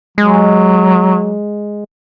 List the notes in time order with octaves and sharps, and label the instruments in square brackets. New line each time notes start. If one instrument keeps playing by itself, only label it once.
[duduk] F#3 [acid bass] G#3